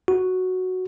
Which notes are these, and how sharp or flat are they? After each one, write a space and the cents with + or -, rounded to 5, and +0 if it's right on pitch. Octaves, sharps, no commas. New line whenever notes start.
F#4 +0